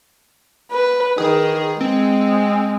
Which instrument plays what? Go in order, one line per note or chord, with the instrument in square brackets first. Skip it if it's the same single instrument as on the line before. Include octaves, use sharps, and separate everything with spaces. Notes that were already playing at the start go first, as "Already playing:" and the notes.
[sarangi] B4
[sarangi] D#3 [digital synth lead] G#4
[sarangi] G#3 [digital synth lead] C4